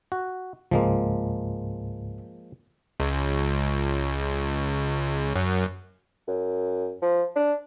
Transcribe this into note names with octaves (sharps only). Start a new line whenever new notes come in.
F#4
C#2 G#2 F3 G#3 A#3
C#2
F#2
F#2
F3
D4